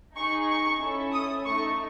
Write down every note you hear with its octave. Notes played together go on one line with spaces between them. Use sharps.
D#4 G#4 C#6
C#6
C#4 E4 A4
D#6
A3 D#4 A4 C#6